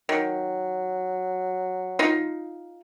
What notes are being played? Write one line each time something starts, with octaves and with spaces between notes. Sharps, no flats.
D#3 F#3
D#4 F4